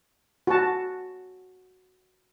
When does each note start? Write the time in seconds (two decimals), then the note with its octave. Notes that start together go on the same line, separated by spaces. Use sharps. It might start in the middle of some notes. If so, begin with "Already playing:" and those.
0.47 F#4 A5